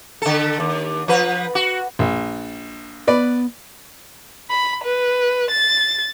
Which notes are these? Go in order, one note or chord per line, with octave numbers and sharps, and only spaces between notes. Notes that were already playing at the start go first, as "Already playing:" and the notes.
D3 A4
D#2
F3 B4
F#4
A#1
B3 B4 D5 B5
B5
B4
A6